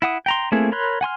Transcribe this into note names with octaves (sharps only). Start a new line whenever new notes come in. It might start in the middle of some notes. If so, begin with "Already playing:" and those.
E4 F#5 D#6
G5 A#5 C6
A3 A#3 C4 E4 G#4
A#4 C#5 B5 C6 F#6
F#5 G#5 C6 F6